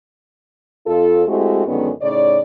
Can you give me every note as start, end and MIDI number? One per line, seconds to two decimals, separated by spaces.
0.87 1.22 41
0.87 1.22 65
0.87 1.22 69
1.27 1.64 56
1.27 1.64 57
1.27 1.64 60
1.27 1.64 64
1.27 1.64 66
1.27 1.64 67
1.66 1.90 42
1.66 1.90 50
1.66 1.90 51
1.66 1.90 56
1.66 1.90 59
1.66 1.90 61
2.02 2.40 45
2.02 2.40 49
2.02 2.40 63
2.02 2.40 73
2.02 2.40 74